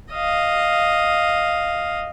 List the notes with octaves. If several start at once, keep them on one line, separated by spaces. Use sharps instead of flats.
D#5 F5